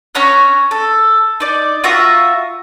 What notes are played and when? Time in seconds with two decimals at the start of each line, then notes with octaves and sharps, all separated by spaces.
0.15 C#4 C#5 A#5 F#6
0.71 A4
1.40 D#4 D5
1.84 F4 F#4 E5 A#5